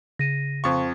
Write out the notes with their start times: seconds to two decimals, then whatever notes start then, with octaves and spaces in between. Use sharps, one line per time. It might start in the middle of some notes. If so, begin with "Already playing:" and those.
0.19 C#3 A#6 D#7
0.64 F2 C5 F5 C#6